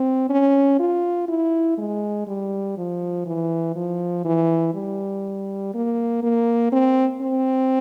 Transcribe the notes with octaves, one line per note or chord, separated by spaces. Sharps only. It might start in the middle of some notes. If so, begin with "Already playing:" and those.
Already playing: C4
C#4
F4
E4
G#3
G3
F3
E3
F3
E3
G3
A#3
A#3
C4
C4